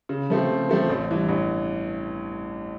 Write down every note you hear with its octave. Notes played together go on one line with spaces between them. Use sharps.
C#3
F3 A3 C4
C#3
F3 A3 C4
A1
G2 E3
A1